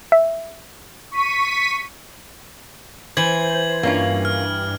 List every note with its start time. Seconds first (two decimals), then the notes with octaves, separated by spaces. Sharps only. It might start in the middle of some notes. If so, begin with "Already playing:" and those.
0.12 E5
1.11 C#6 B6 D#7
3.17 E3 C5 G#6 F#7
3.83 G2 A#3 C#4 F4
4.25 F6